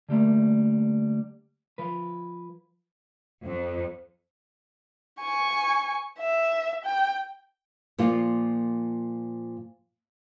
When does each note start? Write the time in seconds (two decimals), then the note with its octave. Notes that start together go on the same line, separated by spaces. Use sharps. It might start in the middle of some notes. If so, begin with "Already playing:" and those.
0.09 D3 G3 A3 A#3
1.78 F3 B4
3.43 F2
5.22 G#5 C#6
6.20 E5
6.85 G5
7.98 A#2 F3 A#3 F4